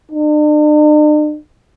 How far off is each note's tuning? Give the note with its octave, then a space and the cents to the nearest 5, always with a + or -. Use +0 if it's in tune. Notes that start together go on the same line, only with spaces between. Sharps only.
D4 +45